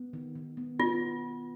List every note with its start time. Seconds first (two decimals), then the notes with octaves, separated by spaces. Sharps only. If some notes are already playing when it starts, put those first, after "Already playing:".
Already playing: B3
0.13 D#3
0.35 D#3
0.57 B3
0.79 B3 F4